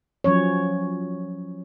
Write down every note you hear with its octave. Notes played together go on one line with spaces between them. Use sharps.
F3 F#3 C#4 C#5